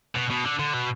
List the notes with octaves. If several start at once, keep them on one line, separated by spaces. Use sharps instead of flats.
B2
B2
D3
D3
B2